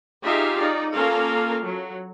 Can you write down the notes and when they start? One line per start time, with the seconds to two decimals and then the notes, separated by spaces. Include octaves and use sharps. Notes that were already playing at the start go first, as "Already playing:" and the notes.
0.23 D#4 F4 G4 G#4 E5 F5
0.60 D#4 D5
0.94 A#3 C#4 F4 A4 A#4 F5
1.64 F#3